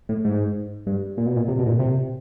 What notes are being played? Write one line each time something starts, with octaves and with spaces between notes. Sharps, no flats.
A2
G#2
G2
A#2
B2
A#2
C3
B2
A2
A#2
C3